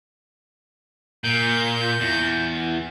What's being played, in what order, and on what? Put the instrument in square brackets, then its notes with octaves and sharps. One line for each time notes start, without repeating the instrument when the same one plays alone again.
[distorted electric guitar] A#2 [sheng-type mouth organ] G6
[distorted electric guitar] E2